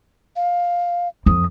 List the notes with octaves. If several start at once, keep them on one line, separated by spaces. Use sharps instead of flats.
F5
F2 D#6